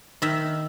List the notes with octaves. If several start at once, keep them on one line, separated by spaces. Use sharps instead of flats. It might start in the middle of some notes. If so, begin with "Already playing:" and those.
D#3 E5